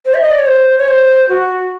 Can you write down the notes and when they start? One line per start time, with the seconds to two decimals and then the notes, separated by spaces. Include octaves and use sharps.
0.06 C5
0.14 E5
0.22 D#5
0.31 D5
0.39 C#5
0.46 C5
0.78 C#5
0.88 C5
1.29 F#4